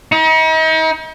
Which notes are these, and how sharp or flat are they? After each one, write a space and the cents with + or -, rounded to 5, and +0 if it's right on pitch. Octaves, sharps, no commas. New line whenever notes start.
D#4 +40